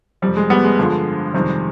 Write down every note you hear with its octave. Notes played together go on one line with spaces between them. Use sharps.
F2 C3 G3
G#3
G3 B3
G#3
G2 D3 F3
F2 C3 D#3 G3